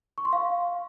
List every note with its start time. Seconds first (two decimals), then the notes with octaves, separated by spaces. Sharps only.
0.18 C#6
0.25 C6
0.33 F5